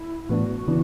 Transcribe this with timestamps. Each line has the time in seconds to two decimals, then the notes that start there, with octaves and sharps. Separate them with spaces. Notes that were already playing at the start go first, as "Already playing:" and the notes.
Already playing: E4
0.29 A2 E3 B3 D4 F#4
0.67 C#3 E3 B3 D4